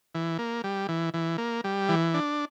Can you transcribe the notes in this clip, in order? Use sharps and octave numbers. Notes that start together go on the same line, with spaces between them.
E3
A#3
G3
E3
E3
A#3
G3
E3
D4